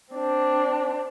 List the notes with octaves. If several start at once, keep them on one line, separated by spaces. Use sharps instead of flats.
C4 D4